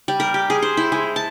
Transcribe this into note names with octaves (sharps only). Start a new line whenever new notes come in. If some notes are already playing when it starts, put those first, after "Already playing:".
G3
A#4
G4
G#4
C5
E4
G#3
A5